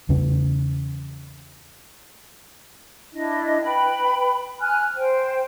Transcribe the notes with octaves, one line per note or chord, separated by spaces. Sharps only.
E2 C#3 C#4
D4 E4 D#5
B4 G5 B5
G#5 F6 F#6
C5 G5